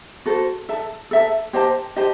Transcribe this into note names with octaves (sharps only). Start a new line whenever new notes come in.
F#4 A4 C5
A4 E5 A5
A4 E5 A5
G4 C5 D#5 A5
G4 C5 D#5 A5